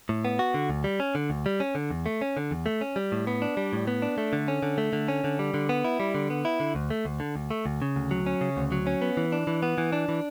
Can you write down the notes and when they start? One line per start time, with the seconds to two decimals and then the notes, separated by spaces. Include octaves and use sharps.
0.09 A2
0.25 B3
0.39 F#4
0.54 D3
0.69 D2
0.84 G3
1.00 C#4
1.15 D3
1.30 D2
1.46 G3
1.60 C#4
1.75 D3
1.90 E2
2.06 A3
2.21 C#4
2.37 D3
2.51 E2
2.66 A3
2.81 C#4
2.96 G3
3.12 A2
3.27 B3
3.42 D4
3.57 G3
3.73 A2
3.87 B3
4.02 D4
4.18 A3
4.33 D3
4.48 C#4
4.63 D3
4.78 A3
4.93 D3
5.08 C#4
5.24 D3
5.39 G3
5.54 D3
5.69 B3
5.84 E4
6.00 G3
6.15 D3
6.30 B3
6.45 E4
6.60 D3
6.75 D2
6.90 A3
7.05 D2
7.20 D3
7.36 D2
7.51 A3
7.66 D2
7.82 C#3
7.96 D2
8.11 F#3
8.26 C#4
8.41 C#3
8.57 D2
8.72 F#3
8.87 C#4
9.02 B3
9.17 E3
9.32 D4
9.47 E3
9.63 B3
9.78 E3
9.93 D4
10.09 E3